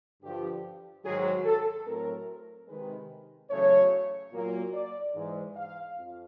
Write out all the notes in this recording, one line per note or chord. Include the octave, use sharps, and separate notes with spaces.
G2 D3 F3 G4
G#2 D#3 F#3 G#4
A4
A2 F#3 A3 C4 A#4
C3 D#3 G#3 B4
E2 C#3 F#3 A3 C#5
A#2 F#3 A#3
D5
G#2 E3 G#3
F5
F2